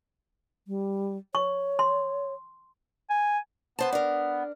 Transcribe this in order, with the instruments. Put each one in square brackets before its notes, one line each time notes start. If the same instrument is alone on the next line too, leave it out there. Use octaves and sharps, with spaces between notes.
[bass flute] G3
[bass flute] C#5 [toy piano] C#6
[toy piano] C6
[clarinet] G#5
[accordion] B3 [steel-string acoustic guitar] B4 C5 A5
[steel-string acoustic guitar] D4 A#4